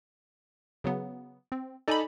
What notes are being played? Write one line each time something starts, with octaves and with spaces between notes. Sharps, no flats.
C#3 F#3 B3
C4
D#4 A4 D5 G#5 B5